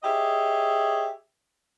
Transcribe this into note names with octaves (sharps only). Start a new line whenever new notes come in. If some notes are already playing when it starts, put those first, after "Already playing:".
G4 G#4 C#5 D#5 E5